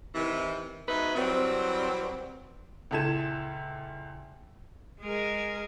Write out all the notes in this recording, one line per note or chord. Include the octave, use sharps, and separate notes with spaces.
C3 D#3 E3
G#2 B2 D#4 B4 E5
E3 F#3 G3 C4
C#2 A#2 E4 A4 G#6 E7
G#3 G#4 A#4